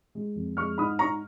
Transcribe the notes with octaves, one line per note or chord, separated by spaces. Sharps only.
G#3
F2
G#3 C#6 F6
G#2 B5 D#6
G#2 A#5 C#6